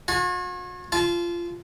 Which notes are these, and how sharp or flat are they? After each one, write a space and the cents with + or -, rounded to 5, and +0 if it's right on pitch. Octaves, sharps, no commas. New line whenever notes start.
F#4 -45 G#5 +0
F4 -20 A5 -30